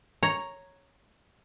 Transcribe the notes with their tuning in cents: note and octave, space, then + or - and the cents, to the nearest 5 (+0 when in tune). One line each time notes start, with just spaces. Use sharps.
C#5 +0 A#5 +0